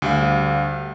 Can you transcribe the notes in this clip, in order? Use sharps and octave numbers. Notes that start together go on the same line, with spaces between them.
D2 G3 F5